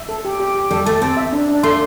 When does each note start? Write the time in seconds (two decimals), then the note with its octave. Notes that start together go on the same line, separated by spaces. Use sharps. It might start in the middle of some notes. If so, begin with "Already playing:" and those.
Already playing: E5
0.09 A4
0.25 G4
0.40 G4
0.56 G4
0.71 G3 A4
0.86 A3 A5
1.02 C4 A5
1.17 E5
1.33 D4
1.49 D4
1.63 A3 C6